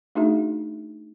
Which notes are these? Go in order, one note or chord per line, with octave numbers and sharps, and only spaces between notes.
A3 D4 D#4 F#4 G#4 E5